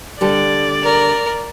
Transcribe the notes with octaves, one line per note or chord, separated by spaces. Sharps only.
D3 G3 A4 D5
A#4